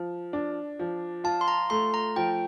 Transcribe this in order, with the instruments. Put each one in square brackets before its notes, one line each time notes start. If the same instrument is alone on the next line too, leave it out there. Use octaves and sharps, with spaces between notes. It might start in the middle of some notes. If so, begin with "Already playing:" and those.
Already playing: [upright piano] F3
D4
F3
[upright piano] F4 [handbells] A5
[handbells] C6
A#5
[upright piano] A3 [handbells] C6
[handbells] A#5
[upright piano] F3 [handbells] G5